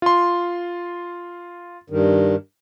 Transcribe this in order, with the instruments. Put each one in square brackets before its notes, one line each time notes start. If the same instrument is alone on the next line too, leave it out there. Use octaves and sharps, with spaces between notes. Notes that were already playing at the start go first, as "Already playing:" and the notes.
[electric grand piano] F4 C6
[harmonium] G2 D#3